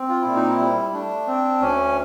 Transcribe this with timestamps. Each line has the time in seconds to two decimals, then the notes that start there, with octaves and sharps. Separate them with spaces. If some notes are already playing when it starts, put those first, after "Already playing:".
Already playing: C4
0.09 F4
0.22 A#2 E4
0.35 D#4
0.49 E4
0.60 G3
0.93 A3 D4
1.27 C4
1.60 D2 C#4